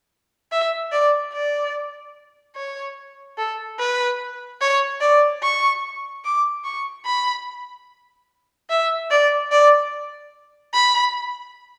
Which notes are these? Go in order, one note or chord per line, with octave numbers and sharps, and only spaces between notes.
E5
D5
D5
C#5
A4
B4
C#5
D5
C#6
D6
C#6
B5
E5
D5
D5
B5